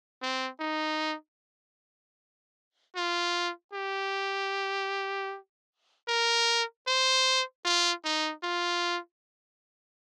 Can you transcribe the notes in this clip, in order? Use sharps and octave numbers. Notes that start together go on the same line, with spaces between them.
C4
D#4
F4
G4
A#4
C5
F4
D#4
F4